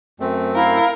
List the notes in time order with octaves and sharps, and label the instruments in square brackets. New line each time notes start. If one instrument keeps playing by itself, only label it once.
[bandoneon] F#2 A3 C4
[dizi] E4 [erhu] A#4 [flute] F5